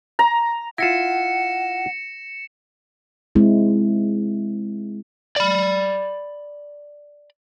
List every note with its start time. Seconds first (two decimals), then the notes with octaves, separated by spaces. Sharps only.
0.19 A#5
0.78 E4 F4 F#5 A#6 C#7 E7
3.35 G#3 C4 E4
5.36 D5 B5